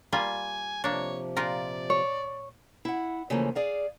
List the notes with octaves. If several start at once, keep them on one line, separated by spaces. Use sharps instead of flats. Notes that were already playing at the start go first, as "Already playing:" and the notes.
G3 A#3 F4 G#5
C3 F3 A#3 D4 C#5
A#2 F4 A#4 D5
C#5
E4 F#5
C#3 E3 F3 A3 A#3
G#4 D5 F5